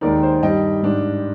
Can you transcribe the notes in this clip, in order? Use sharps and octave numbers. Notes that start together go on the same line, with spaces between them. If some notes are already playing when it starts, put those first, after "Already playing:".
D#2 D#3 G#3 D#4 A#4 D5
C5
G2 D#3 G3 D#5 G5
G#2 G3 D4